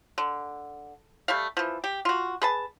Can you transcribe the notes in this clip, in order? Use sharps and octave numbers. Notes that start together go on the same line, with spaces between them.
D3
G3 A3 F5
E3 F3
G4
F4 F#4
G#4 B4 A5